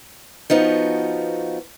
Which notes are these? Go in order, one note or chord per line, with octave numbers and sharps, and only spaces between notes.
F3 B3 D#4 F#4